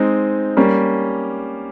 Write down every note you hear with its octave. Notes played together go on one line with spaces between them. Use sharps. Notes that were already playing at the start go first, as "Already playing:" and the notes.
Already playing: G#3 C4 D#4
G3 A#3 C#4